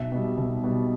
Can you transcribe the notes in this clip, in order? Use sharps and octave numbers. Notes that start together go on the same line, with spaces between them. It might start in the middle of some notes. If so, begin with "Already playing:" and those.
Already playing: B1 E5
B2 G3
B1
B2 G3